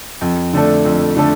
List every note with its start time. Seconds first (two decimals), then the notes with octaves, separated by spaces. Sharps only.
0.21 F2
0.53 D3 A3 D4 A4
0.85 F2
1.17 D3 A3 D4 A4